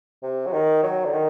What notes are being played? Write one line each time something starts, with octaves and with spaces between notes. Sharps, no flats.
C3
F#3
D#3
F#3
D3
D#3